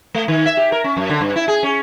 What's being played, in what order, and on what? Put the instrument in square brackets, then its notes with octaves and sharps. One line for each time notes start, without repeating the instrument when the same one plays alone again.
[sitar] A3
D#3
E5
G4
A#4
C#4
F#2
D3
G2
E4
G#4
C#4